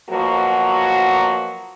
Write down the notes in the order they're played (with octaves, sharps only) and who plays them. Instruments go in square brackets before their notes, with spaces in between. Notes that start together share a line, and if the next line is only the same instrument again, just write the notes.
[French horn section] B2 F3 F#3 A#3 F#4